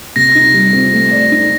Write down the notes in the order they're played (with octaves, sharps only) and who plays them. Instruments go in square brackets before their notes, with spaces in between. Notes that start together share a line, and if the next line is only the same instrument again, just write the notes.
[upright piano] C3 [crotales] A#6
[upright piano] D#4
G3
C4
A3
D5
D#4